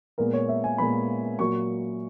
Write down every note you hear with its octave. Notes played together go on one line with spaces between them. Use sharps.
A#2 G#3 B3 A#4
C#5
E5
G#5
A#2 G#3 B3 B5
A#2 F#3 A#3 C#6